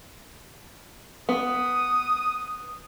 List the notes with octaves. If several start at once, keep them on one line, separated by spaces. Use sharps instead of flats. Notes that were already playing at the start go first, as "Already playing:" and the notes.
B3 D#6